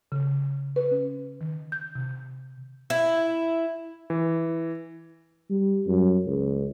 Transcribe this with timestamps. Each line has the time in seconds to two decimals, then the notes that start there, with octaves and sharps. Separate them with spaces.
0.12 C#3
0.76 B4
0.91 C#4
1.41 D#3
1.72 G6
1.95 C3
2.90 E4
4.10 E3
5.50 G3
5.87 F#2
6.27 C#2